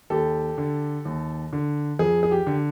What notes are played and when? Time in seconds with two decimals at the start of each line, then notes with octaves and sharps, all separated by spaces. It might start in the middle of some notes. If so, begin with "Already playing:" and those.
0.10 D#2 G4 A4
0.58 D3
1.05 D#2
1.53 D3
1.99 F2 G#4
2.23 G#4
2.31 G4
2.47 D3